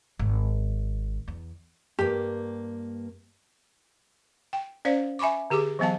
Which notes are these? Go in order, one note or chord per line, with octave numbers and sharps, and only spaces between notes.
G#1
E2
G2 A#3 G4
G5
C#4 C5 D5 F5
E5 G#5 B5 C#6 D6
D3 G4 G#4 D6
E3 F#3 B3 F5 A5